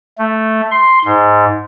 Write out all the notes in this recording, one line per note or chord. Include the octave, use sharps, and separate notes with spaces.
A3
C6
G#2